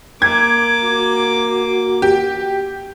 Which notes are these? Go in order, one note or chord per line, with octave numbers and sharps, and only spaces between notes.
A#3 D6 G#6
F#4
G4